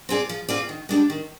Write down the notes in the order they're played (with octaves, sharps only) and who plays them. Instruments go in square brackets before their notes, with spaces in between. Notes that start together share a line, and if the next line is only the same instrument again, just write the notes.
[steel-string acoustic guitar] C4 F4 G#4 D5
F3
C4 F4 G#4 D5
D#3
G#3 D4 G4 D5
D#3